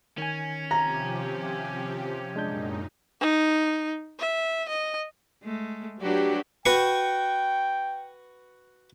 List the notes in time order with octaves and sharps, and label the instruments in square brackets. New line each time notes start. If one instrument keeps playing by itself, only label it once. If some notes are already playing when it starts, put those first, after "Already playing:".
[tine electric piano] D#3 G#5 [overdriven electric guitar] C#4
[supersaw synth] C3 F3 G4 [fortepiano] A#5
[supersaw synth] F#2 A#2 D#4 [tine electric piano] G#3 D4 G6
[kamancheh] D#4
E5
D#5
[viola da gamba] G#3 A3
[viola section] F#3 G4 [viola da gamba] D4 F#4 B4
[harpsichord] F#4 B4 C#6 [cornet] G5